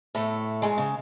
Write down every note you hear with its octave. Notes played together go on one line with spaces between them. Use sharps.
A2 A3
G#2 G#3
C#3